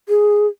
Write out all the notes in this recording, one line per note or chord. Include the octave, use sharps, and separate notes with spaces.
G#4